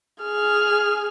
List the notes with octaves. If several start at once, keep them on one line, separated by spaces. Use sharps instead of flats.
G#4 F6